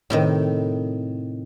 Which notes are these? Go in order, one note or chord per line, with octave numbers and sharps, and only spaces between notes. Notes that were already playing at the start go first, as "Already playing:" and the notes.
A2 C3 D#3